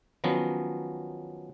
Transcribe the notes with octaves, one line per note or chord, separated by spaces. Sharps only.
D#3 F3 F#3 B3 C#4